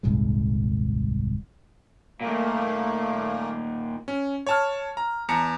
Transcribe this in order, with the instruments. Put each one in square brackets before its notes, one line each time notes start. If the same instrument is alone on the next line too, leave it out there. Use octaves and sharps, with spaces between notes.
[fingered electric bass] D#1 C2 G#2 G#3
[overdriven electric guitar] A#2 D#3 [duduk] A3 [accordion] A#3
[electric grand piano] C#4
C#5 A5 F6
A#5
E2 A5 A#5 C#7